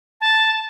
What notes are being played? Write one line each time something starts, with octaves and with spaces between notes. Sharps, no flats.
A5